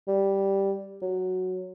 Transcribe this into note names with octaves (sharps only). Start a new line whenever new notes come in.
G3
F#3